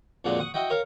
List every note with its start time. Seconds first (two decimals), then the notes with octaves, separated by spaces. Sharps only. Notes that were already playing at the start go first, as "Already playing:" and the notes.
0.24 F2 A#2 F#3 G#3 D4
0.39 F#5 C#6 D#6
0.54 E4 F#4 D#5 G5
0.70 A#4 C#5 F5